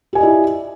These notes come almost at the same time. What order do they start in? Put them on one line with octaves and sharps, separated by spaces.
G4 G#5 D#5 D5 E4